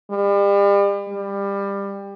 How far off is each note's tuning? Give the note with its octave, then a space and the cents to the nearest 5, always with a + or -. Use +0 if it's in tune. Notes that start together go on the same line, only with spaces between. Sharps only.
G3 +40
G3 +20